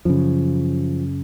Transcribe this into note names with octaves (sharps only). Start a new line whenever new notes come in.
F#2 C#3 F3